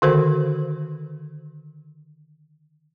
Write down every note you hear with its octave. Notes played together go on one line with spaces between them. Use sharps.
D3 D#3 F#4 A4 A#4 C5